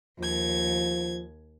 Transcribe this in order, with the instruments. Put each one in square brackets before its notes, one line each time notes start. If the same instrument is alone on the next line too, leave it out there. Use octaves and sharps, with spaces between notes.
[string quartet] D#2 G#6 [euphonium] F3